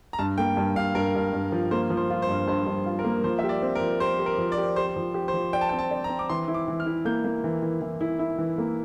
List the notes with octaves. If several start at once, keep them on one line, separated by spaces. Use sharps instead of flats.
A#5
G2 A5
A#3 G5
G2
G2 F5
G2 A#4
G2
G2
F3
A#3 C5
F3
C5
F4
C5
G2
G2 C5
G2
F4
A#4
A#3
F3 C5
E5
G4
D5
C4
A#4
F3
G4 C5
G4
A#4
F3
D5
G4
G4 C5
F3
G4
C5
F3
D5 G5
A5
G5
C4
A5
D5
A#5
C4
D6
E3 C6
E4
D6
E3
F6
E4
A#3 G6
A#3
E3
E3
E3
E4
E4
E3
A#3